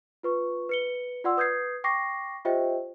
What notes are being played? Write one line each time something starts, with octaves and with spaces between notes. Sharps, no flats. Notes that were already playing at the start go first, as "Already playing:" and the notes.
F4 B4 C#6
B4 C#7 G7
F4 D5 F#5 C6 E6
B4 D#6 G6 G#6 C7
G5 C#6 D6 A#6 C7
F4 G4 C5 D#5 E5 G5